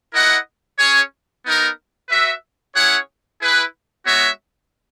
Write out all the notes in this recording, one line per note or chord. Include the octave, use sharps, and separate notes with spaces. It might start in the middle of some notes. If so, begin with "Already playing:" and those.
E4 A#4 D#5 F#5
C#4 G#4 C#5
B3 D#4 A#4
F#4 B4 E5
C#4 E4 G#4 C#5 F#5
E4 G#4 B4
G#3 B3 F#4 C#5 E5